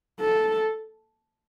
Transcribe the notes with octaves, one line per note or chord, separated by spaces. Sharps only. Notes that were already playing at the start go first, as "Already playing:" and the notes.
A4